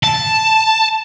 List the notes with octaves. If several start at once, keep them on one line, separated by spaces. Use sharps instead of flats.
A5